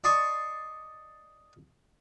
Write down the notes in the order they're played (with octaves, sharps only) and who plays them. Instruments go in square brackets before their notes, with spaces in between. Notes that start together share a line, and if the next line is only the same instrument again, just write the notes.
[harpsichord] D5 D#5 A5 C6 C#6